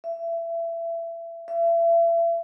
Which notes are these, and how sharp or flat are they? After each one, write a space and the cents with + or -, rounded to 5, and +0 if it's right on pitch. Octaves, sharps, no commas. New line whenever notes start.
E5 +25
E5 +35